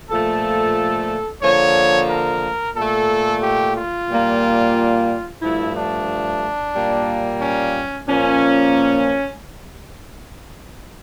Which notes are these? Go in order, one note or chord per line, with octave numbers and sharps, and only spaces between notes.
A#2 F3 A3 A4
D3 F3 A#3 C#5
A#4
A#2 A3 A4
G4
F4
A#2 G3 A#3
G2 F3 A3 E4
D4
A#2 G3 A#3
C#4
A#2 F3 A#3 C#4